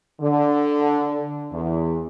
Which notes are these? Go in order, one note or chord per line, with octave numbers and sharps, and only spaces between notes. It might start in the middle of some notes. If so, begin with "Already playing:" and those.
D3
E2